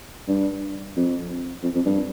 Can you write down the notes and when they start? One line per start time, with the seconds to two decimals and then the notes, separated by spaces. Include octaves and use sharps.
0.28 G2
0.96 F2
1.63 F2
1.75 F2
1.86 G2